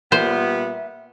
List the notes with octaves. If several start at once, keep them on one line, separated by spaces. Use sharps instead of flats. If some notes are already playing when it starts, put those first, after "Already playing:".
A#2 G3 B3 C5 E5